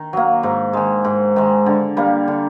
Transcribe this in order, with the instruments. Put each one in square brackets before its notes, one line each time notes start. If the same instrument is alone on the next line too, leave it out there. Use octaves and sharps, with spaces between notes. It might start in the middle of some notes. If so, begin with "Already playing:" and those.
Already playing: [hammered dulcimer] D#3
F#3 A#3
G#2
D#3 G#3
G#2
D#3 G#3
D3
G3 A#3
D3